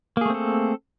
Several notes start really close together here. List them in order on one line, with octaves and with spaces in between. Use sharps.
A#3 G#4 A3 C4 A4